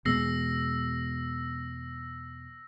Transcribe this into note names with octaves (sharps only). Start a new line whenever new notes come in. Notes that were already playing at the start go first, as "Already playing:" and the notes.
E2 B2 G#3 E6 A#6 C7